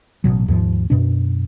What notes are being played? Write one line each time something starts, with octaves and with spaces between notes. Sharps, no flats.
A1 G2 B2 F#3
D#2 G#2 F3
F#2 B2 D4